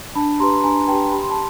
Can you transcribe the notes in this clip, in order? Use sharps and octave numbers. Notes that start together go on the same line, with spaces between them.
D4 A5 B5
G4 B4 A#5 C6
D4 G#5 A#5
G4 B4 G5 A5
G4 B5
C6
A5 B5